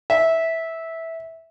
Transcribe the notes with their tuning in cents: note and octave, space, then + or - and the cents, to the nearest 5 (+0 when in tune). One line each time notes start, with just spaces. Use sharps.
E5 -10